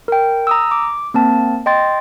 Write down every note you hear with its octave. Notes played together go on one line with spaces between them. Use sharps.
A#4 G5
A#5 D#6 E6
D6
A#3 C4 A5
D#5 G5 C6 A6